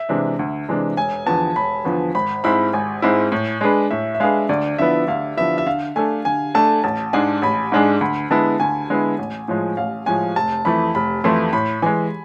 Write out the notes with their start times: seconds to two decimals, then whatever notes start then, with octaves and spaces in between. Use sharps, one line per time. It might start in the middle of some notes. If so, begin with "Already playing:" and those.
Already playing: E5
0.09 C3 E3 G#3 D4
0.39 D2
0.69 C3 E3 G#3 D4
0.97 E1 G#5
1.26 E2 D3 F3 B3 A5
1.56 E1 B5
1.85 E2 D3 F3 B3
2.14 G#1 B5
2.44 G#2 G#3 C4 E4 B5
2.73 G#1 G#5
3.02 G#2 G#3 C4 E4
3.32 A2
3.61 G#3 D4 G#4 B4
3.90 A2 E5
4.15 E5
4.20 G#3 D4 G#4 B4 F5
4.49 D2 D5
4.78 D3 F3 B3 E4 E5
5.07 D2 F5
5.37 D3 F3 B3 E4 E5
5.58 E5
5.66 D3 F5
5.96 A3 D4 A4 G#5
6.25 D3 G#5
6.54 A3 D4 A4 A5
6.84 A1 A5
7.13 G#2 G#3 D4 G#4 G#5
7.42 A1 B5
7.72 G#2 G#3 D4 G#4
8.01 D2 B5
8.30 D3 G#3 B3 E4 A5
8.60 D2 G#5
8.90 D3 G#3 B3 E4
9.18 A1
9.48 A2 F3 G#3
9.77 A1 F5
10.06 A2 F3 G#3 G#5
10.36 F1 A5
10.65 F2 E3 A3 E4 B5
10.95 F1 B5
11.24 F2 E3 A3 E4 C6
11.53 A2 B5
11.82 E3 G#3 G#5